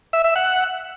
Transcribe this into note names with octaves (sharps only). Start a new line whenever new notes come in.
E5
E5
F#5